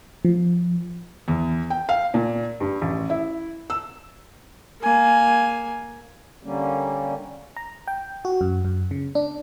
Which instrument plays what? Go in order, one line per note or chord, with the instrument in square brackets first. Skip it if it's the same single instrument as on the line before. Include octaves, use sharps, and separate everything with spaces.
[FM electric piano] F3
[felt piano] E2
G5
F5
A#2
G2
A1
E4
E6
[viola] A#3 G#5
[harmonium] D3 G3 A#3 C#4
[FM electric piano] A#5
G5
F#4
F#2
F#2
C#3
D4